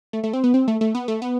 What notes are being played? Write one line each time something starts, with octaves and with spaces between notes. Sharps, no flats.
A3
A3
C4
B3
C4
A3
A3
B3
A3
B3